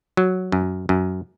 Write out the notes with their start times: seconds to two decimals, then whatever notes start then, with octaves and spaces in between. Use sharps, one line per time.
0.17 F#3
0.52 F#2
0.89 F#2